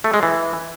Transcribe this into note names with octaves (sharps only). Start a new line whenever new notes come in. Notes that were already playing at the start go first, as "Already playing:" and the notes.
A3
G#3
E3